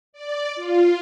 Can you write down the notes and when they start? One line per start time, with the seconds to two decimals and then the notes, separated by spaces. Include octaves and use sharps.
0.13 D5
0.56 F4